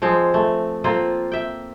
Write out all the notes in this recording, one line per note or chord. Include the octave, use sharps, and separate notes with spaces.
F3 G#3 C4
A3
A#3 C4 F4 A4
E5 G5